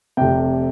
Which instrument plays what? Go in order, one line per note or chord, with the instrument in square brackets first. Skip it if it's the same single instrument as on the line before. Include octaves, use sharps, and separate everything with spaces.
[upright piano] F1 F2 C3 G5